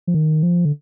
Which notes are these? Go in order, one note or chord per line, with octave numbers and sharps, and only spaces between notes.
F3
D#3
F3
D3